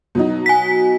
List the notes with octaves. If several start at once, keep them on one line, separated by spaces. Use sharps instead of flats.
B2 F#3 D#4
G#5 B6